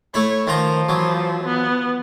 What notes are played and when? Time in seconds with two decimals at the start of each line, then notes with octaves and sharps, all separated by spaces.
0.14 A3 E4 C#5 B5
0.47 D#3 F3 F4 A#5
0.89 E3 F#3
1.44 B3